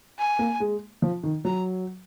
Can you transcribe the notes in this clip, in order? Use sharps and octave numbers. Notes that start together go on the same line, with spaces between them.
G#5
A#3
G#3
F3
D#3
F#3 A#5